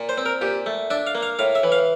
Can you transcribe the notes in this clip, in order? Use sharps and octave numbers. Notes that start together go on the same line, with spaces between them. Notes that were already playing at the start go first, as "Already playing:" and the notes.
Already playing: A#2
C5
C4
A#4
A#2 G4
A3
D4 E5
F5
A#3
F5
A2 F5
E5
E3
F5